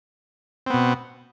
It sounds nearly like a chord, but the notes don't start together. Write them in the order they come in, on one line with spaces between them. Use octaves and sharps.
C4 B3 B2